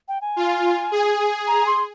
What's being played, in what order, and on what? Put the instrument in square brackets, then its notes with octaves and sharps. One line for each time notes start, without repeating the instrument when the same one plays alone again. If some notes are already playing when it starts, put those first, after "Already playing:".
[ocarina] G5
G#5
[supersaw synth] F4
G#4
[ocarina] A#5
C6